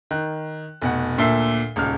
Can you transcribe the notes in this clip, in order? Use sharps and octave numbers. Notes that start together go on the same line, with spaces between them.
D#3 F#6
F1 B2 F#5
D2 A#2 A4 E5 C7
D#1 C#2 F6